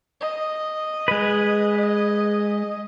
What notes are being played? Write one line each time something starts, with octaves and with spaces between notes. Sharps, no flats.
D#5
G#3 B4